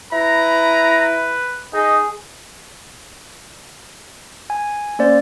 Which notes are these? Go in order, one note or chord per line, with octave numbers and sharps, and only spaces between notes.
E4 B4 A#5
D#4 G#4 D#5
G#5
A#3 C#4 C5 D5